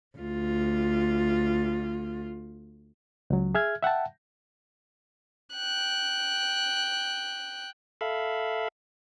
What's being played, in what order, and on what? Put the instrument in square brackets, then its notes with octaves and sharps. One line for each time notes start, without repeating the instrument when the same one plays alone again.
[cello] D2 F4
[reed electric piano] C#2 F#3
G#4 E5 F6 G#6
E5 F#5 G5 A5
[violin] G5 F#6
[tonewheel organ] A4 E5 F5 B5